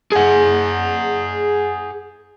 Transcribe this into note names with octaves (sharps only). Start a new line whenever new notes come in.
G#4 F#5